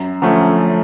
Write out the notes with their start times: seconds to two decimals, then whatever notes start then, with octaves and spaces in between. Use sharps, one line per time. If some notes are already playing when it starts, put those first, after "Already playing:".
Already playing: F#2
0.22 D3 F3 A3 C#4